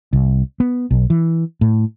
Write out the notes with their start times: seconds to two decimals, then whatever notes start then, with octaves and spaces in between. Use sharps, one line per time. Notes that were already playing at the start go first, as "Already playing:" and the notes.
0.13 C2
0.60 B3
0.91 B1
1.10 E3
1.61 A2